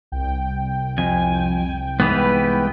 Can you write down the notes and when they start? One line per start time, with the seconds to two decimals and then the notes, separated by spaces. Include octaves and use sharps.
0.12 C2 G5
0.98 F2 G#5
2.00 G#2 E3 B3 B4